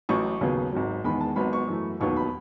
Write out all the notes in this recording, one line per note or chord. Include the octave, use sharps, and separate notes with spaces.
A1 A2 F#3 C#6
D#2 C#3 F#3 B3
G#1 G#2 F#3
E1 E2 D#3 G#3 B5
A5
G#1 G#2 F#3 B3 B5
C#6
F#2 E3 A3
E1 D#2 D#3 F#3 B3 C#6
B5